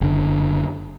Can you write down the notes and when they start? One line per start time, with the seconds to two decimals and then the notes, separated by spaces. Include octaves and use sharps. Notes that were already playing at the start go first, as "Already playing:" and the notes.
0.01 F#1 D3